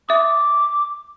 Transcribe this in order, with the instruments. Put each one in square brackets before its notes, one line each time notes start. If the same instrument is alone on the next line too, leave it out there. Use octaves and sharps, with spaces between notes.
[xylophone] E5 D#6 [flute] D6